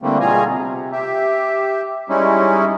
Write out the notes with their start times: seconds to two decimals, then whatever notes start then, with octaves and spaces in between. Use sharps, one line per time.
0.02 D3 E3 G3 A3 A#3 C4
0.20 B2 G3 F4 G#4 G#5 A#5
0.46 C3
0.92 G4 E5
2.09 G3 G#3 C#4 D#4 E4